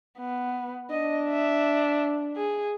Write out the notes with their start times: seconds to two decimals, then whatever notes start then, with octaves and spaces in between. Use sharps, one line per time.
0.18 B3
0.91 D4 D#5
1.29 E5
2.36 G#4